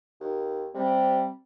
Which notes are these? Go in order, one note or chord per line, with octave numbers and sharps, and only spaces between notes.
D#2
C3 G3 C4